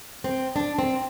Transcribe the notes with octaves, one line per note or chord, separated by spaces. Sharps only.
C4
D4
C4